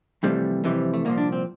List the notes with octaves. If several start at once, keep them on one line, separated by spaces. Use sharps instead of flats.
F2 C3 E3 G3 A3
F2 C3 E3 G3
A3
C2 A#2 F3 A#3
D4
C4